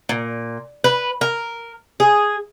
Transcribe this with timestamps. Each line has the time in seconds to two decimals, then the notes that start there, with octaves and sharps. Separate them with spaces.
0.09 A#2
0.84 B4
1.21 A#4
2.00 G#4